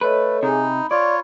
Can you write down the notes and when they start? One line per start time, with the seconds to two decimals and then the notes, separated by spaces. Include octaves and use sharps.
0.01 A3 A4 B4 C#5 D#5
0.43 C3 D#4 G#4 G#5
0.63 B5
0.91 F4 C#5 D5